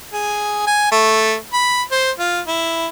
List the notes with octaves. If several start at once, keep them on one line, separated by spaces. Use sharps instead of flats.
G#4
G#5
A3
B5
C5
F4
E4